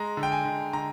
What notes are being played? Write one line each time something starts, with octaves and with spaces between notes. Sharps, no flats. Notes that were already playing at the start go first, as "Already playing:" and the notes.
Already playing: G#3 A#5
D3
G5
G#5
D3
D3 A#5